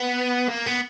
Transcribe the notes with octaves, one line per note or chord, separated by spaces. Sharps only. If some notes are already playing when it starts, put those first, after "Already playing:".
Already playing: B3
A#3
B3